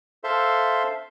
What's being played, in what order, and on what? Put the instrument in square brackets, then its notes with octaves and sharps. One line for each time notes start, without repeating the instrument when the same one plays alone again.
[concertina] A4 C5 E5 F5 C6